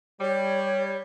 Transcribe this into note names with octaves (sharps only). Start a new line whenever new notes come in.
G3 C#5